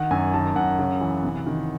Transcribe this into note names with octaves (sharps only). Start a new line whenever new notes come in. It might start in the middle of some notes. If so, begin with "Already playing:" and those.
Already playing: D#3 F#5
F#2 G#5
D#3 A5
F#2 F#5
C#3
E3
C3
D#3